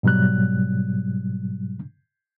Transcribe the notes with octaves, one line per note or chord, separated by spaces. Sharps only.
G#2 B2 F#3 G3 F#6